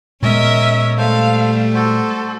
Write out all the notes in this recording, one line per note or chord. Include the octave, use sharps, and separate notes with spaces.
A#2 G#3 B3 C#4 A#4 C#5 D#5 E5
G3 A3 A4 C5 F5
F#4 A4 C5